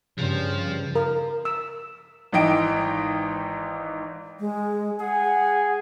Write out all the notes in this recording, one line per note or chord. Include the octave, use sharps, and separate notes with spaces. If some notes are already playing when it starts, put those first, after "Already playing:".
G2 C#3 F3
A#4
E6
G#1 G#2 E3 D#5 G5 D7
G#3
G#4 F#5